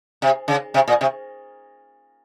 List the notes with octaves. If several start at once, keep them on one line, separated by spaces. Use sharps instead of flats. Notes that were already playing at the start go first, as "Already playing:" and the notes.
C3
C#3
C3
A#2
C3